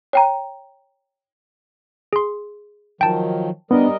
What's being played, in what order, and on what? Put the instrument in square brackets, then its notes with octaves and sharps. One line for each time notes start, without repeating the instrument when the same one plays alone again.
[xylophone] C#5 G5 A#5
[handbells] G#4 C6
[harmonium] D#3 F3 F#3 [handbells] G5 A5
[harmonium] G3 A#4 D#5 [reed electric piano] B3 D4